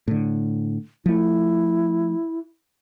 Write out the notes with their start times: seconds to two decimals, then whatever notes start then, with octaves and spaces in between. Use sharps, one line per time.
0.08 A2 D3
1.06 F3 A3 E4